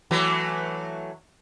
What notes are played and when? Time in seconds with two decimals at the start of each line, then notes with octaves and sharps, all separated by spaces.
0.11 E3 F#3 A3